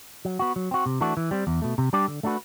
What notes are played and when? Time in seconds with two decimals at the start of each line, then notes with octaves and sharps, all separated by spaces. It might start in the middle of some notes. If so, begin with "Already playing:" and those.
0.25 F#3
0.39 B3 F#4
0.56 F#3
0.71 C4 F#4
0.86 C3
1.01 E3 A3 D4 F#4
1.17 E3
1.31 G3 C4
1.47 E2
1.62 B2 A3
1.78 C3
1.93 G3 D4 G4 D5
2.08 D3
2.23 A3 D4 F#4 B4